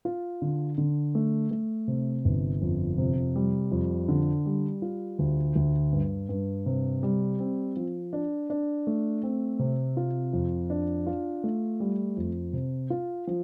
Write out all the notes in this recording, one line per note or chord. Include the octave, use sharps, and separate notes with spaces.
F4
D3
D3
A3
A3
C3
G1
F2
C3
G3
F2
D3
G3
F4
D2
D2
G2
G2
C3
G3
C4
F3
D4
D4
A3
C4
C3
F4
F2
D4
F4
A3
G3
F2
C3
F4
F3